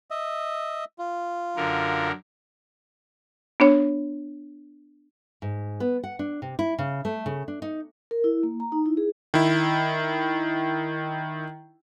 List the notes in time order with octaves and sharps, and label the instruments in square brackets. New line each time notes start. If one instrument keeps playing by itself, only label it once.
[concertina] D#5 E5
F4
[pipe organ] F#2 D3 A#4
[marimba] B3 D4 C#5
[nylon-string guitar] G#2
B3
F#5
D4
C3
E4
C#3
A3
C#3
D4
D#4
[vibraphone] A#4
E4
A#3
A#5
D#4
E4
G#4
[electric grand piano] D#3 E4